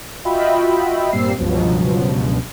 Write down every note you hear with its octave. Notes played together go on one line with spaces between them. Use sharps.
F4 F#4 D#5 E5 G5 B5
G2 A#2 G3 C4 E6 C7
C#2 G2 B2 F3 F#3